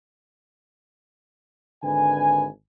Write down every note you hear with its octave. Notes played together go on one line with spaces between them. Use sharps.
G#1 D3 B4 G#5